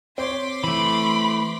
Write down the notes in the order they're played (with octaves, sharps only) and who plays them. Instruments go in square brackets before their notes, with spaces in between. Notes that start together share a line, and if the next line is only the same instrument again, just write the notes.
[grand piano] C4 C5 C#5 [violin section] C6 D6 B6
[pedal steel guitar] E3 A3 [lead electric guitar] B5